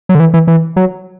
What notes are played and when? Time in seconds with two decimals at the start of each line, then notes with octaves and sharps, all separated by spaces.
0.09 F#3
0.15 D3
0.20 E3
0.34 E3
0.47 E3
0.76 F#3